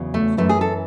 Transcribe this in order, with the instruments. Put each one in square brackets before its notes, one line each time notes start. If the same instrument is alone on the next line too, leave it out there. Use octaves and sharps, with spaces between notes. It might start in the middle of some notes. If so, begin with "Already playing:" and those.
Already playing: [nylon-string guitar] E2 C#3 F#3
A3
F#2 E3 A3
G#4
A4